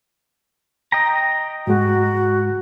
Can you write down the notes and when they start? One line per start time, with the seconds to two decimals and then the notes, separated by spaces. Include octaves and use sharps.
0.92 D#5 G5 A#5
1.67 G#2 G#3 F#4